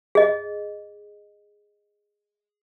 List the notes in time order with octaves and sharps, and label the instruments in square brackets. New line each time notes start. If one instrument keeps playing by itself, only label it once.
[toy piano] G#4 D#5